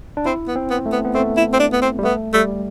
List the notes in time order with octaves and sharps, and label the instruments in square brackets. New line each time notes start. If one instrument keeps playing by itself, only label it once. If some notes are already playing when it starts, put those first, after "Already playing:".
[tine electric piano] D4
[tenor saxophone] C4 [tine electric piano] E4
[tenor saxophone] B3
[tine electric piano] C4
[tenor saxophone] B3
[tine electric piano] A3
[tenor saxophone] B3
[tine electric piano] B3
[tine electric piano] A3 [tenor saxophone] C4
[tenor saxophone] E4
C4
D4
B3
C4
[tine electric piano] G3
[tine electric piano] A3 [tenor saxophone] B3
[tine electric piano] G3 [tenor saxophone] A3